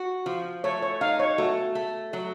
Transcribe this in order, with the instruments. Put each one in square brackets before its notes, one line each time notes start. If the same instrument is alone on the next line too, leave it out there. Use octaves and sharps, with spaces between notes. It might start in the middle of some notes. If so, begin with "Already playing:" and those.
Already playing: [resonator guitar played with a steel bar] F#4
F3
[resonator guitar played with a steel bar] A3 [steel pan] C#5
[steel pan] C#5
[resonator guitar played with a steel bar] D#4 [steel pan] F5
[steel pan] C#5
[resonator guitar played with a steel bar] A3 [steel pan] F#4
[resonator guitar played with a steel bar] A3
F#3